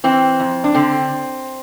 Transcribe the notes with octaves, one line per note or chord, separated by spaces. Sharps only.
E3 C4
F2
D4
D3 C4